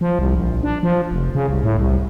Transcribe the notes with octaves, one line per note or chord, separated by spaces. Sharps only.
F3
C2
A#1
D4
F3
F1
C#3
C2
A2
C2